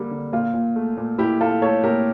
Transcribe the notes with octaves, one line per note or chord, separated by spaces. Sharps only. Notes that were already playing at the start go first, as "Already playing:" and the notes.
Already playing: D3 G3 A#3
D3
A#2 F4
A#2
A3
A#2
A#2 E4 G4
A#2 F4 A4
A3 A4 C#5
A#2 G4 A#4